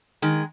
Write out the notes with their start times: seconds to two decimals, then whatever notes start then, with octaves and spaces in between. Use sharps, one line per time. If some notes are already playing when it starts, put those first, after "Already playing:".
0.22 D#3 G#3